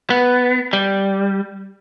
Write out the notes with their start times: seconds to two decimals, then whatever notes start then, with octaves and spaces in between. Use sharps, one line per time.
0.10 B3
0.73 G3